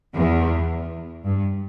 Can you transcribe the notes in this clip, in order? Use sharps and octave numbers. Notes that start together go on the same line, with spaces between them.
E2
G2